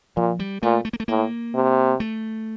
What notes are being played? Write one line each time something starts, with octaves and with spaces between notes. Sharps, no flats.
A#2 F3
G3
A#2 A3
A3
A#3
A3
A2 A#3
C3
A3